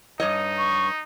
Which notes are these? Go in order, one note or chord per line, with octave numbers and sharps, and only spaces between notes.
G2 D#4 C#5 D#5
C#6